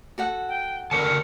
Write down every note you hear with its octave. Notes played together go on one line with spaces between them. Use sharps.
F#4 A4 F#5
G5
D3 A#4 C#5 A5 C#7